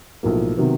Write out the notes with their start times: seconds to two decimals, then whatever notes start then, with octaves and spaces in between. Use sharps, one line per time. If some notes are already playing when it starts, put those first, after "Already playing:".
0.23 B1 A2 F3 A#3
0.57 C3 D#3 F#3 B3